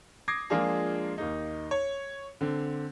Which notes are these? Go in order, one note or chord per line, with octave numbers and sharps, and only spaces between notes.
D6 D#6 G#6 A#6 C7
F3 G#3 A#3 D4 F4 G#4
D#2 A#3 D#4
C#5
D3 C4